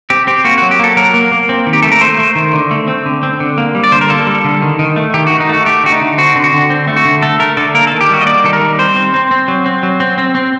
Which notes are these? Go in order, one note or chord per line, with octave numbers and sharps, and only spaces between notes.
C4 G4
C4 G4
A#3 F#4
F#4
F#3
G4
A#3 A4
F#3 A#4
A#3
A#3
C4
D#3
G4
A3 A4
A#4
A3 C5
A3
D#3
D3
A3
C4
D3
C4
D3
A#3
G3
D5
D3 C5
A#4
A#3 A4
G3
D3
D#3
D#3
A3
D#3 G4
F#4
D#3
D#4
A3 F#4
A3 G4
D3 F#4
D#4
D3
C4 F#4
D3
F#4
D3
C4
A3
F#4
D3
A3 A4
A3 A#4
D3 A4
A#3 A#4
A4
D#3
G4
G3 F#4
D#5
A#3 D5
D#3 A4
A#4
G3
C4 C5
C4
C4
C4
F#3
C4
F#3
C4
C4
C4